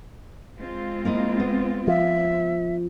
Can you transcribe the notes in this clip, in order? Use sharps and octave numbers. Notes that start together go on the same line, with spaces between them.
G#3 C4 F4
A#3 E4 D#5
B3
F3 E5